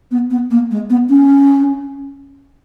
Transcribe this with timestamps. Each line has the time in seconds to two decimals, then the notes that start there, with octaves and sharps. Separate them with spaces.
0.11 B3
0.30 B3
0.50 A#3
0.71 G#3
0.89 B3
1.09 C#4